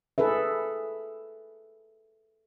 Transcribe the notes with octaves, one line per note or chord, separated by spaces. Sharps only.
G#4 A4 B4 E5